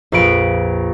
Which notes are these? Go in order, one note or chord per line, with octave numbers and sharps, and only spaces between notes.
A#1 F2 F4 B4 F5 D7